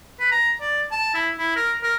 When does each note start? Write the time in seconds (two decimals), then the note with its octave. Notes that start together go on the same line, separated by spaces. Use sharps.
0.20 B4
0.32 A#5
0.61 D5
0.91 A5
1.14 E4
1.38 E4
1.56 A#4
1.83 A#4